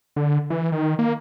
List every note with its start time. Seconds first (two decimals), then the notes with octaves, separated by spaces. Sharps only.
0.16 D3
0.50 E3
0.72 D#3
0.99 A#3